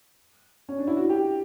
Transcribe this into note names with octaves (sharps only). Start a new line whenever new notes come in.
C#4
D4
E4
F#4
G4